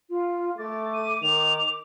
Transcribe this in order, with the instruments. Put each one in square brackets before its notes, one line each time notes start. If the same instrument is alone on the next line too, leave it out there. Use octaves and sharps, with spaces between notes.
[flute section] F4
[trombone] A3 [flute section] D6 [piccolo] A6
[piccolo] D#7
[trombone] D#3 [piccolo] F7